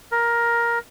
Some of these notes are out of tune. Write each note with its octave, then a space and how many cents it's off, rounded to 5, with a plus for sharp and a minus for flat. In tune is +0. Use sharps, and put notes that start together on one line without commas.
A#4 +10